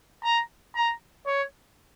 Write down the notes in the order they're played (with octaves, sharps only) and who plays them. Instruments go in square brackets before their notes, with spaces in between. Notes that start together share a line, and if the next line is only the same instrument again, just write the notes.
[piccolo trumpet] A#5
A#5
C#5